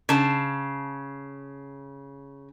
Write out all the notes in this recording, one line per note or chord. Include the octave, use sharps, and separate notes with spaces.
C#3 A5